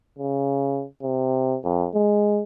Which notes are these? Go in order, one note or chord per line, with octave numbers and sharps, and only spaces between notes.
C#3
C3
F2
G#3